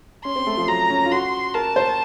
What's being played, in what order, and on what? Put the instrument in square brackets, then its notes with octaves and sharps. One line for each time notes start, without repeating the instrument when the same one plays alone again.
[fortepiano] C#4 [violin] C6
[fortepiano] C4
A3
F3
[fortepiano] F#3 [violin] A#5
[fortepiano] C#4
F4
[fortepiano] F#4 [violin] C6
[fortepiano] A#4 [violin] A5
[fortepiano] C5